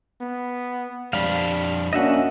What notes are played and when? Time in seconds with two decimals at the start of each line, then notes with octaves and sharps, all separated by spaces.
0.21 B3
1.13 F2 G3 C4 D4 F5 B5
1.93 A#3 C#4 D4 F#4 D#5 E5 F#5